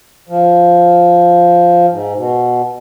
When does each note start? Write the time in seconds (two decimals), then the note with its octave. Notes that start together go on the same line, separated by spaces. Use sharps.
0.29 F3
1.91 G#2
2.15 B2